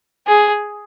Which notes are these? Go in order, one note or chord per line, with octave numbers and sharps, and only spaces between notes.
G#4